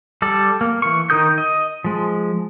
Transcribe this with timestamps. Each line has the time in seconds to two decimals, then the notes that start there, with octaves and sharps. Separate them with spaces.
0.22 G3 A4 D5
0.61 A#3
0.82 E3 C#6
1.10 D#3 D#4 A#4 D#6 G6
1.38 D#5
1.84 F3 G#3